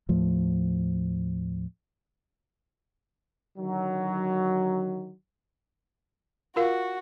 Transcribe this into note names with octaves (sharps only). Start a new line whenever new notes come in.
D#2 A2 F3 A3
D3 D#3 F#3
F4 F#4 A#4 F5